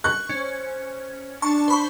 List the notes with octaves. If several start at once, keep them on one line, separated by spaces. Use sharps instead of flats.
C#6 F#6
C#4 C5
D4 A5 C#6
C5 B5 C#6